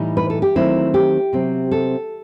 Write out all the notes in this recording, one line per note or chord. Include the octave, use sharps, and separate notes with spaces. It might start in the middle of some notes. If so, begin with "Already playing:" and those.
Already playing: A2 E3 G3 D#4
B4
A4
G4
D#3 F#3 A3 C4 E4
G4
C3 F#3 C4
A4